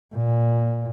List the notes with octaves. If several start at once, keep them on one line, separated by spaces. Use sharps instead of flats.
A#2